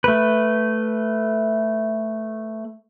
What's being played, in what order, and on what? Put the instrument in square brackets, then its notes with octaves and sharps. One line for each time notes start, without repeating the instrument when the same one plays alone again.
[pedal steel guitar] A3 B4